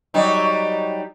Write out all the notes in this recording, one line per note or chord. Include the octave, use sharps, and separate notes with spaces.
F#3 G3 D#4